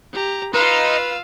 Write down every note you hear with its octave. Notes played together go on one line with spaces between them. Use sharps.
G4 A#5
D#4 F4 B4 F5 C6 E6
F5